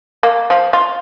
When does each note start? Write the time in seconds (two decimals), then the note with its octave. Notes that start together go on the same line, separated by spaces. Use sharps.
0.23 A#3
0.50 F3
0.73 F4